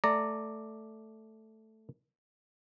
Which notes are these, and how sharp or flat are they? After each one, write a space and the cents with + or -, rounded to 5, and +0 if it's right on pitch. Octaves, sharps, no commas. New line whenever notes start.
A3 +0 D5 +0 A#5 -15